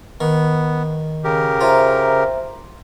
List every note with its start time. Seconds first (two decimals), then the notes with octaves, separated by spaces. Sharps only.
0.21 D#3 B3
1.24 C#3 G4 A#4
1.61 F4 C5 E5 A#5